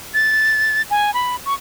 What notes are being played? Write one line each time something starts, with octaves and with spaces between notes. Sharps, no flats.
A6
G#5
B5
C#6